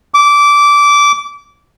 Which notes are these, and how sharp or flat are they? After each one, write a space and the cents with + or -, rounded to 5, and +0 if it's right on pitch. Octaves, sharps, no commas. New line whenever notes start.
D6 -15